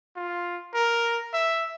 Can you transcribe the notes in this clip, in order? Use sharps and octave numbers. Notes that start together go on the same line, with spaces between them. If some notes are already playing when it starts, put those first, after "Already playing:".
F4
A#4
E5